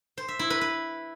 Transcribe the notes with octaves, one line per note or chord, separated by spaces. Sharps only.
C5
E5
E4
B4
B4